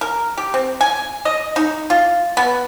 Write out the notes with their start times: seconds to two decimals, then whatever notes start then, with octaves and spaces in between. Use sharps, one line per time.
0.01 A#4
0.38 G4
0.54 C4
0.81 G#5
1.25 D#5
1.56 D#4
1.90 F4
2.37 B3